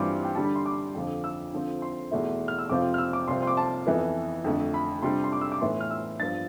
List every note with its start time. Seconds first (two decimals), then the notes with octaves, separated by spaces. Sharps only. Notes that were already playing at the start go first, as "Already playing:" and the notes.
Already playing: G2 E3 G3 C4 F4 C6 D6
0.25 G5
0.35 D3 G3 D4 A5
0.45 B5
0.56 C6
0.66 D6
0.95 F2 D3 F3
1.24 E6
1.53 D3 F3 C4
1.82 C6
2.11 E2 B2 A3 E4
2.48 F6
2.59 E6
2.69 F2 C3 F3 C4 F4 D6
2.94 F6
2.98 E6
3.13 D6
3.28 C2 C3 F3 C4 C6
3.43 C6
3.47 D6
3.57 A5
3.87 F2 E3 B3 E4
4.44 F2 D3 A3
4.74 B5
5.02 C3 G3 D4 C6
5.24 C6
5.33 D6
5.41 E6
5.52 D6
5.61 A2 E3 B3 E4 C6
5.81 F6
5.91 E6
6.19 G2 F3 B3 A6